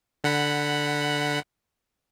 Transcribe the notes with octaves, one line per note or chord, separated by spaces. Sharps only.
D3 F#5 B5